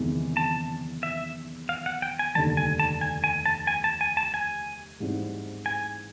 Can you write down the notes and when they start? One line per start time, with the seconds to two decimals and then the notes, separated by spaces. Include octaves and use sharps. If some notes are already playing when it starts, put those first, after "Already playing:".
Already playing: F#1 E2 C3 D#3 G#3
0.37 A5
1.03 E5
1.69 F5
1.86 F#5
2.02 G5
2.19 G#5
2.35 F1 D#2 D3 G3 A5
2.57 G#5
2.79 A5
3.01 G#5
3.24 G#5
3.46 A5
3.67 G#5
3.84 A5
4.01 G#5
4.17 A5
4.34 G#5
5.00 A1 G#2 E3 G3 C4
5.66 G#5